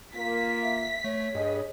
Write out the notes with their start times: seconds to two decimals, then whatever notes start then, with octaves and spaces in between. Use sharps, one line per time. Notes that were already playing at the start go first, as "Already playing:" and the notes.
0.15 A#3 F4 B6
0.63 E5
1.04 A3 C#5
1.35 G2 G#4 D#5